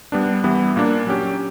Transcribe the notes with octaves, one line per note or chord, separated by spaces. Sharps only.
G3 B3 D4
E3 G3 B3 E4
A#2 A#3 D4
F#3 C#4 G4